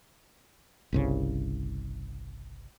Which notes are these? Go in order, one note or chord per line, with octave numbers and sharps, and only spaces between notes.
G1 C2 C#3